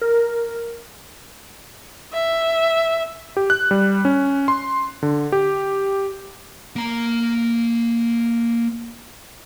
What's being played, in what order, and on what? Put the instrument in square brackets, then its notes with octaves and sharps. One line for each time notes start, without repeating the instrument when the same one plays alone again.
[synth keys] A#4
[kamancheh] E5
[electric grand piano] G4
F#6
G3
C#4
C6
D3
G4
[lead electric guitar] A#3 A#5